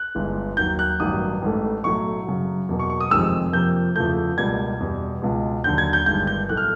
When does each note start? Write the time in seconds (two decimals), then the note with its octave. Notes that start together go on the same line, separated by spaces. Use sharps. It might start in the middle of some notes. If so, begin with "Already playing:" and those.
Already playing: F#6
0.15 G1 G2 E3 G#3
0.57 D#2 D#3 F#3 G6
0.79 F#6
1.00 A1 G2 D#3 F#3 D#6
1.42 A1 G#2 E3 A3
1.84 B1 A2 F#3 A3 C#6
2.26 F#2 C#3 F#3
2.69 E2 B2 F#3 A#3
2.79 C#6
2.90 C#6
3.00 D#6
3.10 F1 F2 C3 D#3 G#3 E6
3.53 F2 C3 F3 A#3 G6
3.95 E2 C#3 F3 A3 G6
4.37 C#2 B2 G3 A#3 G#6
4.80 E2 B2 G3
5.22 C#2 B2 G#3
5.64 D#2 D3 F#3 G6
5.78 G#6
5.93 G6
6.06 G1 G2 D#3 G#3 G6
6.27 G6
6.49 B1 A2 E3 A3 F#6
6.57 F6